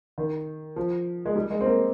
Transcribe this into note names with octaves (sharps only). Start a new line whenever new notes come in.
D#3
F3
G#3
G3
G#3
C4
A#3